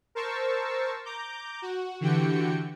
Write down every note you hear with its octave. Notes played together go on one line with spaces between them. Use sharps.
A#4 C5 A5 C#6 E6
A#5 D6 G6
F#4
D3 E3 F#4 G4 G5 C#7